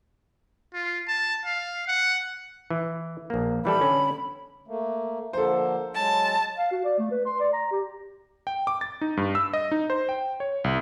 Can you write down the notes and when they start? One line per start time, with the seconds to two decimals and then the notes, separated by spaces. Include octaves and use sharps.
0.74 F4
1.08 A5
1.46 F5
1.88 F#5
2.70 E3
3.30 A#1 A#3
3.65 E3 G3 A4 B5
3.81 D3 C#4
4.68 A3 A#3
5.33 D3 F3 A#3 A4 C5
5.94 F#3 G#3 A5
6.57 F5
6.71 F#4
6.84 D5
6.99 A3
7.11 B4
7.26 C6
7.40 D5
7.53 A#5
7.72 G4
8.47 G5
8.67 D6
8.81 A6
9.01 D#4
9.17 G2
9.35 E6
9.53 D#5
9.72 D#4
9.90 C5
10.09 G5
10.40 C#5
10.64 C2